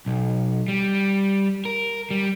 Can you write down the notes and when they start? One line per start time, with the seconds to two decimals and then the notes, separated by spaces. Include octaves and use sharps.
0.06 B1
0.68 G3
1.65 A#4
2.11 G3